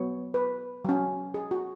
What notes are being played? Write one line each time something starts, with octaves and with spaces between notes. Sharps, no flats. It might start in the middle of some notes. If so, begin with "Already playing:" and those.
Already playing: F#3 B3 C#5
B4
F#3 C#4
G#4
F#4